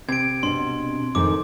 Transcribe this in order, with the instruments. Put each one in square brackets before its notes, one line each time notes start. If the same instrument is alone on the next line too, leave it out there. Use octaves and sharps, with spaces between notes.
[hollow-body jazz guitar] C3 [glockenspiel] G#6 D7
[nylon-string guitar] B2 D4 [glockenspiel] C6
[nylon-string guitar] F2 G#2 D#3 [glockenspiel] D6